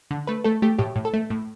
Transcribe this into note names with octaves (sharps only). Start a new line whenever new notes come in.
D3
A3 B4
A3 A4
A3 G4
A2 G4
A2
A4
A3
A2